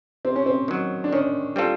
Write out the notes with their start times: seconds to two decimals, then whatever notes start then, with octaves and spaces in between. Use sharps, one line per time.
0.25 C3 C4
0.36 C#4
0.46 C4
0.68 D#3 F#3
1.04 D4
1.12 D#3 C#4
1.56 G3 C4 F4 A4